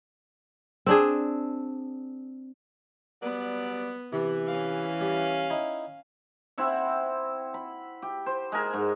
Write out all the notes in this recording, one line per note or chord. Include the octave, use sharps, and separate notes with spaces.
C4 D4 G#4
F#3 G3 B3 D5
C3 E3
C#4 F5
G3
D#4 E4
C4 E4 E5 F#5
B5
G4
C5
G#3 G#4 A#4
G#2